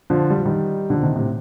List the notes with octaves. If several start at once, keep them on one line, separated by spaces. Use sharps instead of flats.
D3 F3
G3
F3
D#3 G3
D3 F3
C3 D#3
A2 C3